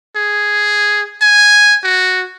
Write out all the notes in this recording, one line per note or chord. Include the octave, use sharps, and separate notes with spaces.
G#4
G#5
F#4